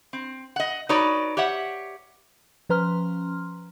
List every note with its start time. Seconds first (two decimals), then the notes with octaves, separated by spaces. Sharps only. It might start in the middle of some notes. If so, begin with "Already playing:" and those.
0.13 C4
0.56 D#5 F#5
0.89 D#4 F#4 B4 C#5 D5
1.37 G4 C#5 E5 F#5
2.69 F3 C#4 B4 A#5 C6 F6